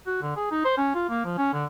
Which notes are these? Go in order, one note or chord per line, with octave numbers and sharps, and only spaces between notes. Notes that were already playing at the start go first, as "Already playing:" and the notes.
F#4
D3
G#4
D#4
C5
C#4
F4
A#3
F3
C#4
D3